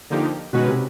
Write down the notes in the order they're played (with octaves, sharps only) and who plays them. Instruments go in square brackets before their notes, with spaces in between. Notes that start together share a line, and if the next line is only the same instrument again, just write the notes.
[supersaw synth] D3 F3 A#3 D#4 G4
[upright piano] B2 [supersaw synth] D#3 G#3 C#4 F#4 B4
[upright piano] C3